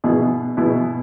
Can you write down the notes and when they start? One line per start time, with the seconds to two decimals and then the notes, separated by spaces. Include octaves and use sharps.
0.04 B2 B3 E4 G#4
0.57 B2 B3 E4 G#4